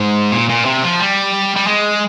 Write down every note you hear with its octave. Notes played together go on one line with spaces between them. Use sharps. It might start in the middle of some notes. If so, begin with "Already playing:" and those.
Already playing: G#2
A#2
A#2
C3
F3
G3
G3
G#3